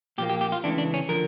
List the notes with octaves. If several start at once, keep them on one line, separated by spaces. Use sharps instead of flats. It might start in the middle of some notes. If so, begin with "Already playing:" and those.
A#2 F3 A#3 G4
G4
G4
F4
C#2 C#3 E3 A3 D4
D4
C#4
D3 F3 A#4